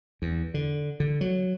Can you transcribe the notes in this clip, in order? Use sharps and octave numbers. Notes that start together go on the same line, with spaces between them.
E2
D3
D3
F#3